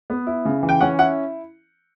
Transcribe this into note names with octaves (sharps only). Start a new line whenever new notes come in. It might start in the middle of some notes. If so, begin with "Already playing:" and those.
B3
E4
C#3
E3
G5
C#4 F#5
E4 F#5